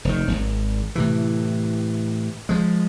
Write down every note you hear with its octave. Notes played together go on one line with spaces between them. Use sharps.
F1 D#3
D#1 G#1
A2 C3 E3
F3 G#3